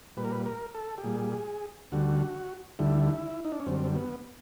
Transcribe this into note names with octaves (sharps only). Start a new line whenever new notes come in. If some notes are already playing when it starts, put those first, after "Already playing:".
A#2 G3 B4
A#4
B4
A#4
A4
G4
A#2 G3 G#4
D2 D3 G3 F#4
D2 D3 G3 E4
D#4
D4
C#4
F#2 D3 G3 C4
B3